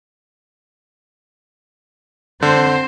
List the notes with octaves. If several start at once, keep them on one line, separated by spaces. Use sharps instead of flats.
D3 C4 C5